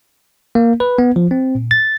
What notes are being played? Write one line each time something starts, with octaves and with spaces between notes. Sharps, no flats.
A#3
B4
B3
F3
C4
A#2
A6